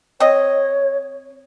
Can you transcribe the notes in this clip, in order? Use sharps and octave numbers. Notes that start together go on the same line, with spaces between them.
C4 C#5 D#5